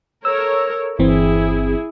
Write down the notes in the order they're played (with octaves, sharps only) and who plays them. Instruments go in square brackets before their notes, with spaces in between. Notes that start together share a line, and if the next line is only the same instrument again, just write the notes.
[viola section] A4 A#4 C#5 [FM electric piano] E6
[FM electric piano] G1 E3 C4 [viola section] E4 G#4